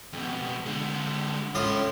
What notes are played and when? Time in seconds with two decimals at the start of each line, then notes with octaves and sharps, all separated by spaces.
0.13 F2 B2
0.66 D3 G#3
1.55 A2 G#3 C#4 F4 D#6